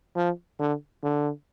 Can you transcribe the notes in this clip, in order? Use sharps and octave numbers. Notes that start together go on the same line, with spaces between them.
F3
D3
D3